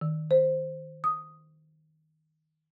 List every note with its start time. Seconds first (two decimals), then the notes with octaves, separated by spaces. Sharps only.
0.01 D#3
0.31 C5
1.04 D#6